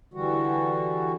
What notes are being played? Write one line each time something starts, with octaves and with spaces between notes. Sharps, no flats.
D3 E3 G3 F#4